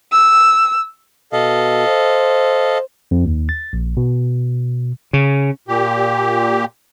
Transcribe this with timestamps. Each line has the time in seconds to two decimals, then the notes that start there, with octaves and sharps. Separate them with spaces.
0.12 E6
1.32 B2 A4 D#5 F5
1.87 C5
3.11 F2
3.25 D#2
3.49 A6
3.73 A#1
3.97 B2
5.13 C#3
5.68 A#2 G4